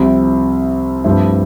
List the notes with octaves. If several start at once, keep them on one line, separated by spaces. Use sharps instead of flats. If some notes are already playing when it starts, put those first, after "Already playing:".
Already playing: C2 C3 F3 C4 E4
G2 F3 A3 C4 E4